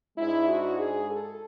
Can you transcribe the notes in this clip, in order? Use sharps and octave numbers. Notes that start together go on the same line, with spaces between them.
G#2 G#3 D4 E4
F#4
G#4
A4